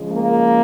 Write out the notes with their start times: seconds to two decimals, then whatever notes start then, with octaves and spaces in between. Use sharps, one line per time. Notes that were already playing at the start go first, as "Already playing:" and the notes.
Already playing: C#3 F3 G#3
0.10 A#3